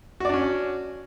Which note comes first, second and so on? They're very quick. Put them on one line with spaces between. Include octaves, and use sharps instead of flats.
F#4 D5 D4 C#4